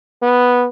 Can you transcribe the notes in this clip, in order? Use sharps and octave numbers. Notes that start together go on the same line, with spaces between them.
B3